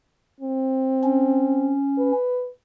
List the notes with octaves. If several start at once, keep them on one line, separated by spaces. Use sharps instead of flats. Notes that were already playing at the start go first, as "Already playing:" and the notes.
C4
C#4
B4